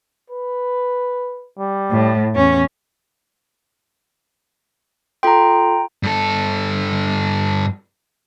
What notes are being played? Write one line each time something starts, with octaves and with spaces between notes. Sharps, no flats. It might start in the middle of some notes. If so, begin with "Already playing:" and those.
B4
G3
A2
E2 C#4 C#5
F4 A4 G5 A#5 C6
G2 A4